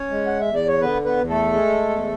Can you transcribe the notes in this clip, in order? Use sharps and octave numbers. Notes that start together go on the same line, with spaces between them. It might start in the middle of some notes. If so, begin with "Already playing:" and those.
Already playing: C#4 C#5
G#3
F#5
E2 E5
D5
C#5
D3 B3 B4
B3 B4
E2
A3 A4
G#3
E2